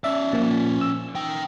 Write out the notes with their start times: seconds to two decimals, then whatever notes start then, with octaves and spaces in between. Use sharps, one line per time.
0.04 C#4 D5 E5
0.33 A#2 F3
0.81 E6
1.15 D#4 G5